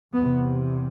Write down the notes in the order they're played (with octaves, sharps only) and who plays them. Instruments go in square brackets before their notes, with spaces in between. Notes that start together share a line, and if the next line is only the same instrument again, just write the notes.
[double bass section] E2 C3 B3